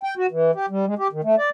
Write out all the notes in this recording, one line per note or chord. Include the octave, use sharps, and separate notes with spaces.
G5
F#4
E3
G4
G3
G#3
G4
D#3
A3
D5